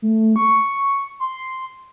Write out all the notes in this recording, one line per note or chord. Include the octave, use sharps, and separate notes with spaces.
A3
C#6
C6